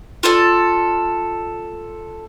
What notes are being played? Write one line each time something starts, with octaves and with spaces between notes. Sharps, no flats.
F4 A4 D5